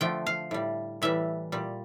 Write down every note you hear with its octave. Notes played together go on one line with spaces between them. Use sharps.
D3 F3 A3 G5
F5
A2 G3
A2 E3 G3 E5
A#2 G3